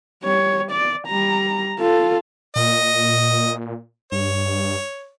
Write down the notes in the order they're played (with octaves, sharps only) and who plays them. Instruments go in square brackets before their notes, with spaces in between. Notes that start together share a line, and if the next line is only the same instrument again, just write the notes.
[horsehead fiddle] G3 C#5
D5
G3 A#5
F4 A4
[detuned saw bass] A#2 [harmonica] D#5
[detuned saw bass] G2 [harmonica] C#5